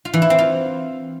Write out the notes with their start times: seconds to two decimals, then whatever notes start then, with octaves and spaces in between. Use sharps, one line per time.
0.05 F4
0.13 E3
0.22 E4
0.30 C4
0.39 F4